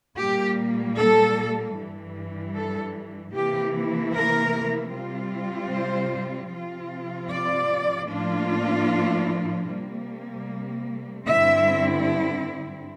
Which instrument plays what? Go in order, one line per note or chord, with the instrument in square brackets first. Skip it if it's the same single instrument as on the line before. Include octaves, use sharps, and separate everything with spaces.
[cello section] A#2 G3 A#3 G4
A4
G2 E3 G3
A4
C3 E3 A#3 E4 G4
A#4
C3 G3 C4 F4
C5
C3 F3 C4 F4
D5
A2 F3 A#3 D4 F4
C3 G3 A#3
G2 D3 G3 C4 E4 E5